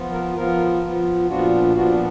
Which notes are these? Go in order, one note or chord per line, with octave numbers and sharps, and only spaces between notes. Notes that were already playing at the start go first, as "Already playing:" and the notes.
Already playing: F3 B3 F4
A#4
F3 B3 F4 A#4
F3 B3 F4
A#2 F3 B3 D4 F4 F#4
A#2 F3 B3 D4 F4 F#4